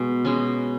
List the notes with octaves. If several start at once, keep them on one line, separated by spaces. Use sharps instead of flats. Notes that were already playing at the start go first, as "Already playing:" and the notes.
Already playing: B2 G#3
B2 G#3 C#4